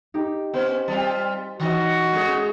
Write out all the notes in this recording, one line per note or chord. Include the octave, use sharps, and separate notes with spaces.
D#4 G4
B3 C#4 C5 G5
G3 C4 F4 A5
E3 D#4 F#4 D#5
G#3 C#4 G#4